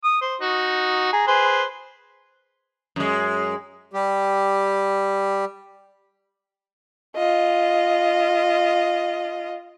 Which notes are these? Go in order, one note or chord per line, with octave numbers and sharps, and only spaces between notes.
D#6
C5
D#4 F#4
G#4 A#5
G#4 B4 C5
F#2 G#3
G3 G4
F4 D#5